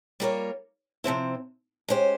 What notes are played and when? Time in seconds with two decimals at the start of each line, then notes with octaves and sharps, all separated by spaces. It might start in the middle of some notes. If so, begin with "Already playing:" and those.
0.20 G3 A#3 F4 A#4 C#5
1.04 C3 F3 C4 E4
1.88 G#3 C#4 G4 C5